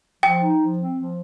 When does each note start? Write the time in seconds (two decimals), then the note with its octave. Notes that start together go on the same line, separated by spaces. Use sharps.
0.23 F3 G5
0.41 D#4
0.60 F3
0.79 C4
0.97 F3